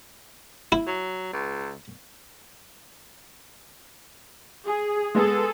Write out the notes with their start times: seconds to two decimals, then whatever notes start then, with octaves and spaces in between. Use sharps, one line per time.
0.72 E4
0.86 F#3
1.33 C#2
4.66 G#4
5.15 G#3 B3 G#4 A4